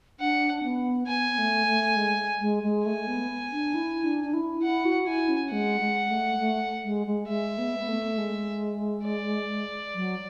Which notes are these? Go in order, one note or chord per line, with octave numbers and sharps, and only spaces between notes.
D4 F#5
B3
B3 G#5
A3
A3
G#3
G#3
G#3
A3 G#5
B3
D4
E4
D4
D4
E4
E4 F#5
F#4
E4 G#5
C#4
G#3 F#5
G#3
A3
A3
G#3
G#3
G#3 E5
B3
B3
A3
G#3
D5
F#3